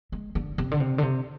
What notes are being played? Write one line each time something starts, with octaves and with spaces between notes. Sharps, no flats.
G#3
D3
C3
D3
C3
D3
C3